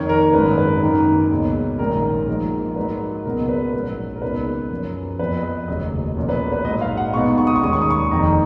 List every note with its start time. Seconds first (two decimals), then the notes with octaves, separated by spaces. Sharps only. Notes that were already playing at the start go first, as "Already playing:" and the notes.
Already playing: F2 D#3 A#3 D#4 C#5
0.09 A#4
0.34 G#1 F#2 D#3 G#3 B4
0.58 B4
0.82 F#2 D#3 A#3 D#4
1.30 C#2 B2 A#3 C#4
1.79 A#1 G#2 D#3 G#3 C#4 A#4
2.28 G#2 F3 A#3 D#4 A#4
2.76 G#2 F#3 A#3 D#4 B4
3.25 C#2 B2 F#3 B3 A#4
3.49 B4
3.73 A#1 G#2 F#3 C#4 B4
4.16 A#4
4.22 C#2 B2 A#3 D#4 B4
4.71 F#2 F3 A#3 C#4
5.19 F2 F3 B3 B4
5.43 D#5
5.68 F1 D#2 C#3 F#3 D#5
6.16 B1 A#2 F3 A#3 C#4
6.29 B4
6.52 B4
6.65 A#1 G#2 F#3 D#5
6.81 F5
6.97 F#5
7.14 B1 B2 G#3 B3 D#4 C#6
7.38 C#6
7.47 D#6
7.56 C#6
7.62 D#2 D#3 G#3 C#4 D#6
7.73 C#6
7.82 D#6
7.91 C#6
8.11 F1 F2 D#3 A#3 A#5